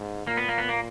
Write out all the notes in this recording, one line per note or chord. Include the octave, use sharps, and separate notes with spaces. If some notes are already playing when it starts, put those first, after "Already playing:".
Already playing: G#2
A#2 A#3
B3
A#3
B3
A#3